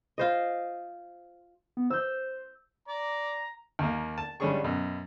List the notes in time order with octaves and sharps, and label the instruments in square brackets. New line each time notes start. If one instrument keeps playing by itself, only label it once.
[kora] F4 C5 D#5
[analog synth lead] B3
[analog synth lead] C5 [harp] E6 G6
[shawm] D5 [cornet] A#5
[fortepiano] D#2 A#3
A5
G#1 G3 C#4 D4 G#4 C#6
F#2 B2